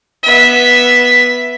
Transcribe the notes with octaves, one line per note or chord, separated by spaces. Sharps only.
B3 E5